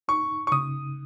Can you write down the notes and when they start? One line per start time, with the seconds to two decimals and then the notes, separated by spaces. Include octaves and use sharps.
0.08 D#4 C#6
0.47 C#6
0.52 C#3 D#6